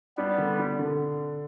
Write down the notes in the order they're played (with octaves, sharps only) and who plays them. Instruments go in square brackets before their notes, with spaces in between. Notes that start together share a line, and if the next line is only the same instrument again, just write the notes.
[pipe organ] G3 B3 [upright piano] D4
[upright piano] D3
D4
D3